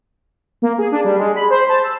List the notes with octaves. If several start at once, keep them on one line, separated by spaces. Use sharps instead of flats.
A#3
G#4
D4
G3
G#3
B5
C5
A5
E6